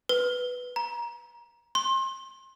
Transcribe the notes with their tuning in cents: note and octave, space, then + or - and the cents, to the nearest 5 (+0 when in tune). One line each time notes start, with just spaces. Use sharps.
B4 +0
A#5 +25
C6 +30